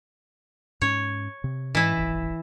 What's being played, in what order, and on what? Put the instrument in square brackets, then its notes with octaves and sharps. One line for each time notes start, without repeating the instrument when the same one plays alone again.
[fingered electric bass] G#2 C#4 [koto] C#5
[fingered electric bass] C3
[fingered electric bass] G#2 [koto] E3 E4
[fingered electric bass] D#1 G#1